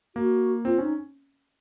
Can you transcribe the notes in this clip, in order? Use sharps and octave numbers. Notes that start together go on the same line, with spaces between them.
A#3 F#4
C4 F4
C#4 D#4